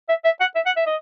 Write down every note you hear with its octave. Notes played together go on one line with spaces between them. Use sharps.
E5
E5
F#5
E5
F#5
E5
D#5